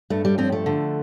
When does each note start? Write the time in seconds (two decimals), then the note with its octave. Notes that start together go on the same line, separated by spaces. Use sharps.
0.10 G2 A3
0.25 G3
0.38 F3 C4
0.52 A3
0.66 D3